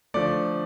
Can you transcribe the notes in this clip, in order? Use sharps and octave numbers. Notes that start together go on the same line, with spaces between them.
D3 F3 A3 D5